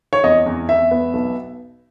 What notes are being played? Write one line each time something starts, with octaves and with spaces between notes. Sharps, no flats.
C#5
E2 D#5
E2
E2 E5
B3
B1